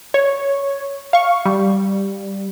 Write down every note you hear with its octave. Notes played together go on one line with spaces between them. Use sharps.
C#5
F5 C#6
G3